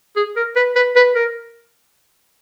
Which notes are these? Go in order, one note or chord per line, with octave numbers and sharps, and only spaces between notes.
G#4
A#4
B4
B4
B4
A#4